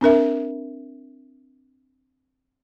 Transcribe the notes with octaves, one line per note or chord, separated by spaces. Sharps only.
C4 D4 A#4 E5